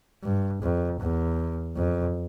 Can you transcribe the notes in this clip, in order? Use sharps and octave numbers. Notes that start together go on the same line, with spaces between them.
G2
F2
E2
F2